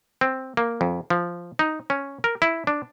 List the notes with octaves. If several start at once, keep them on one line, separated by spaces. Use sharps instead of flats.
C4
A#3
F2
F3
D#4
C#4
A#4
E4
D4